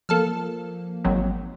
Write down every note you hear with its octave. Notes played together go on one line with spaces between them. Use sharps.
F3 A#3 A4 A5 F6
G#1 F#3 C4